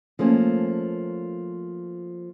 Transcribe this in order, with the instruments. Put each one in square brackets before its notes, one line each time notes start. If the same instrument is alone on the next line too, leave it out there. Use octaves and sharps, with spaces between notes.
[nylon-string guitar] F3 A3 A#3 C#4